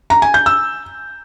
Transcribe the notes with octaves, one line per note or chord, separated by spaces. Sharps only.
A#5
G#5
G6
E6